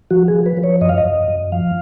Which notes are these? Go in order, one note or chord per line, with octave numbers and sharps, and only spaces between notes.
F3 F#4
G#4
F3
B4
F3
C#5
F#2 D#5
F5
D#5
F#2
F#2
F3 F5